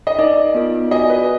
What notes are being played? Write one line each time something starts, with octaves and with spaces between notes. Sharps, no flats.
D#5
D#4 A#4 D5 D#5
B3 F4 A#4
F#4 D5 D#5 G#5
B4